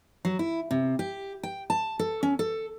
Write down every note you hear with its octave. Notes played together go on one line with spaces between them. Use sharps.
F#3
E4
C3
G4
G5
A5
A4
C#4
A4